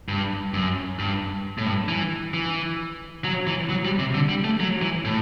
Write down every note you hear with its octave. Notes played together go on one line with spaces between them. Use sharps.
G2
F#2
G2
A2
G2
E3
E3
F#3
E3
F#3
G3
C3
D3
G3
A3
F#3
E3
A2